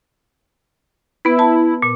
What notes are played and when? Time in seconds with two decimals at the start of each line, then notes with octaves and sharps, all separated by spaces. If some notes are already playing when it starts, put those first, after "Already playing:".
1.25 B3 E4 B4
1.39 A5
1.82 A#2